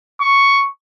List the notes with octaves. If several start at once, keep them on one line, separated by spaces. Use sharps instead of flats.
C#6